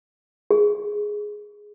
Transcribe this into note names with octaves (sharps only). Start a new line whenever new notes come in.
G#4